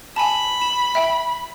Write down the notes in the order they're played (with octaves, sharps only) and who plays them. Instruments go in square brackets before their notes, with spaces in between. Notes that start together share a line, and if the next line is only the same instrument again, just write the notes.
[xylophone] G#5 A5 [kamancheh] B5
[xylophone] E7
E5 G5